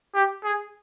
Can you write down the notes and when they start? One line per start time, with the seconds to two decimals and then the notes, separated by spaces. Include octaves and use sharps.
0.14 G4
0.44 G#4